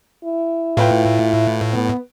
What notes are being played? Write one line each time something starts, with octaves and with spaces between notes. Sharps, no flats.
E4
A2 F4 B4 G5
B3